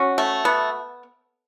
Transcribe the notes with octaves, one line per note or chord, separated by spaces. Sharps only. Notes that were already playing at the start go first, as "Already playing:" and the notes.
Already playing: C#4 F#4
A3
B3